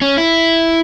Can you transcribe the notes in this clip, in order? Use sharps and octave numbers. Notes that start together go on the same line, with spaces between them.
C#4
E4